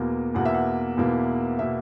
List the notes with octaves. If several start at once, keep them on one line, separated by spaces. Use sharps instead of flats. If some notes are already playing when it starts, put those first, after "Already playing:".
Already playing: E2 B2 A#3
E2 B2 A#3 F#5
E5
F#5
E2 B2 A#3
B2 A#3 E5